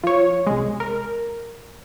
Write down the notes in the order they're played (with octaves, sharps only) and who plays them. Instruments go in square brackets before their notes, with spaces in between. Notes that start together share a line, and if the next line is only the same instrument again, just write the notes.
[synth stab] F3 C#5
C2 G#3
A#4